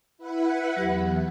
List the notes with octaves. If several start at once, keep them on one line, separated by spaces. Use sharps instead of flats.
E4 B4 F#5
E2 F#3 G4 F#5